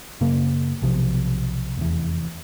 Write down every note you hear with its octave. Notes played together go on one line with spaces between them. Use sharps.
F#2 C#3 A#3
B1 C3 D#3 F3
F1 E2